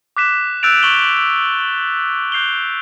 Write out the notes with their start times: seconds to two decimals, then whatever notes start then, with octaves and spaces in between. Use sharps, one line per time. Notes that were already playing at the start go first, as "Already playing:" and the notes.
0.17 D6 F#6 B6 E7
0.63 E6 F#6 G6 A6 D7 F7
0.83 C#6 F#7 G7
2.32 F#6 G6 C7 F7 G7